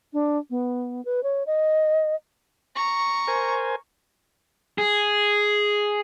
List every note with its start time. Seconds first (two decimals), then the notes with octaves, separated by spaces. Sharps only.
0.13 D4
0.50 B3
1.05 B4
1.23 C#5
1.46 D#5
2.76 A#5 C#6
3.28 A#4 C5 G#5
4.78 G#4